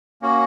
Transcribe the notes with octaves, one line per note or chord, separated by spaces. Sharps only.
A#3 C#4 F#4